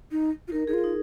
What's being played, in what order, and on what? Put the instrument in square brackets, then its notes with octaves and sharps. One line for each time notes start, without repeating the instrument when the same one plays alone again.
[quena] D#4
F4
[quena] D#4 [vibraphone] A#4
[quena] D#4 [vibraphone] G#4
[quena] F4
[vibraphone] D#4